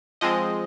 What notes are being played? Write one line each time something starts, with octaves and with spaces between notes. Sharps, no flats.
F3 G#3 C4 D#5